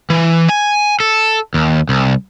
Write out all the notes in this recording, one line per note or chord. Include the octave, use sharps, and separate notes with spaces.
E3
G#5
A4
D#2
C2